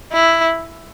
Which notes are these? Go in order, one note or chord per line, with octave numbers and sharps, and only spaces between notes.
E4